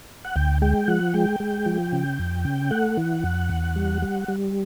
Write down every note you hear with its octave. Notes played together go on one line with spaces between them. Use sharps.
F#5
D2 G5
G#3 G5
F3 F#5
G#3 G5
G#3
F3
C#3
F2
C#3
A3 F#5
E3
F2
E2
G3
G3
G3